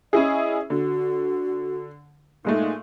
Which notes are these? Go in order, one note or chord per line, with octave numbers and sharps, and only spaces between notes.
C#4 E4 G#4 D#5
D3 F#4
A#2 G#3 A3 D#4